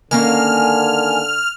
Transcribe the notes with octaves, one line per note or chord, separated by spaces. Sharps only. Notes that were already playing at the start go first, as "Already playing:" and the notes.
D3 D#3 A#3 C#4 G#5 F6